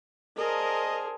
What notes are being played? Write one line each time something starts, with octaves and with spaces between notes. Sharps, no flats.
D4 G#4 A#4 C5 D#5